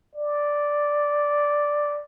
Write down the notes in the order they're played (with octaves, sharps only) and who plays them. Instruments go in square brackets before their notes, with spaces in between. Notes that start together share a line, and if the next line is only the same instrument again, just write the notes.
[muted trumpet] D5